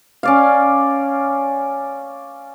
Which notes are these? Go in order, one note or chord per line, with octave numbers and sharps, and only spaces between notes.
C#4 D5 F5